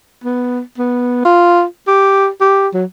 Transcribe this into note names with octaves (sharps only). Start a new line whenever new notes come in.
B3
B3
F4
G4
G4
F#3